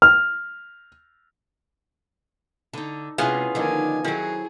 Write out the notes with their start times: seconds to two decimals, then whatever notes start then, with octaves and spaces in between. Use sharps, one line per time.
0.02 F6
2.73 D3 D#4 A4
3.18 C3 G#3 B3 C#4 E4 F4 G#4
3.55 D3 D#3 F3 A#3 D#4 G#5
4.04 D#3 F#3 C4 E4 F#4 G#4 A4